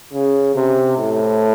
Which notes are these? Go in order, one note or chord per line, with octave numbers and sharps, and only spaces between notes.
C#3
C3
A2